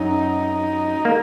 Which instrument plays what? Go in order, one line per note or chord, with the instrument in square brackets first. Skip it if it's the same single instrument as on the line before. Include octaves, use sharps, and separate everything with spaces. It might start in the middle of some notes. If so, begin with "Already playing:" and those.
Already playing: [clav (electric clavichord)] F#2 F#3 [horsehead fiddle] D#4
[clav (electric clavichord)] A#3